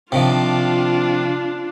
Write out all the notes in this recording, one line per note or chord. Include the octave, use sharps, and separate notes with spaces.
C3 D#3 F3 D4 F4